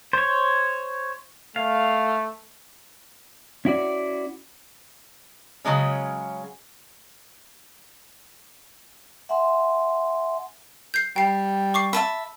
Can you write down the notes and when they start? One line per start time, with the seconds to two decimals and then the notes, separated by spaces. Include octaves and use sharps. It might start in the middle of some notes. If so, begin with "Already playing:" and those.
0.13 C5 C#5
1.56 A3 F5
3.65 C#4 E4 F#4 D5
5.65 C#3 F#3 G#3 C#4
9.29 E5 F#5 G#5 C6
10.94 G6 C7
11.16 G3 G5 C7
11.74 C#6 D6 C7
11.93 E5 A5 B5